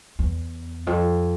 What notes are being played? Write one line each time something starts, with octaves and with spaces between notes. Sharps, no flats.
E2
F2